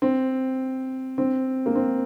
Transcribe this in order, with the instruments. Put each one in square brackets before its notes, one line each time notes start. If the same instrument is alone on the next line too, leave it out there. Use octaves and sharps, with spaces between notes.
[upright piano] C4
C4
A#3
C4